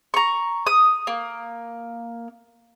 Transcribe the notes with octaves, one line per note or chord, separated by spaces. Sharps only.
A#5 C#6
D#6
A#3